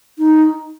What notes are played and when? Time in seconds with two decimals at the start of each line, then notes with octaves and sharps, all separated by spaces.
0.18 D#4